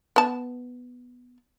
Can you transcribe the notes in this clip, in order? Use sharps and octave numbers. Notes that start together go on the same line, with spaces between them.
B3 A5